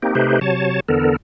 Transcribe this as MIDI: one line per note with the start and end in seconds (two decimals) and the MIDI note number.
0.02 0.15 58
0.02 0.15 60
0.02 0.15 63
0.02 0.15 67
0.15 0.39 48
0.15 0.39 57
0.15 0.39 63
0.15 0.39 67
0.15 0.39 71
0.15 0.39 72
0.41 0.80 48
0.41 0.80 54
0.41 0.80 73
0.41 0.80 81
0.88 1.16 40
0.88 1.16 50
0.88 1.16 59
0.88 1.16 69
0.88 1.16 70